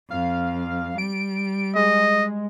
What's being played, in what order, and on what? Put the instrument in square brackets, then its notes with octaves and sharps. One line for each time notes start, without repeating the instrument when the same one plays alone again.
[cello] F2 [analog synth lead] F5
[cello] G3 [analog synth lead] D7
[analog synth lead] G#3 [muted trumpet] D#5